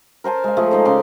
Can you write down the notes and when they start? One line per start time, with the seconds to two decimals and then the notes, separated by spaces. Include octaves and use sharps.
0.24 A#4 C5 G#5 A5
0.44 G#3 F5
0.57 F3 A3 G#4
0.71 G#3 D#4 C5
0.85 C#3 A5 C6 D6